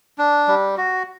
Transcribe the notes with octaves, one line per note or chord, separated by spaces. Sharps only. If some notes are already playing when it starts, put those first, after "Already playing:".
D4
G3
F#4